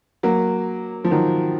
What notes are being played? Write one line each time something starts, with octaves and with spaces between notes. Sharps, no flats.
F#3 A#3
F3
D#3 F#3